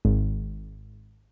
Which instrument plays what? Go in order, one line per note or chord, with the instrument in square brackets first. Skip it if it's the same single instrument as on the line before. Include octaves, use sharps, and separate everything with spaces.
[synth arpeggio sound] G#1